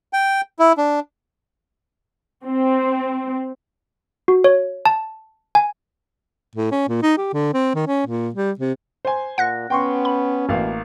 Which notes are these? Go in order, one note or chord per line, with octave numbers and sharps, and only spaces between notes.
G5
E4
D4
C4
F#4
C#5
A5
G#5
A2
C#4
A#2
D#4
G4
D3
C4
D#3
C#4
A#2
G3
C3
C5 G#5
A#2 F#5 F#6 A#6
B3 C#4 G5 C6 C#6
B5
A1 B2 A#3 F5